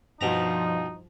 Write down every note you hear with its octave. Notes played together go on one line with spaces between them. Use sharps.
G2 B2 F3 D#4 A#5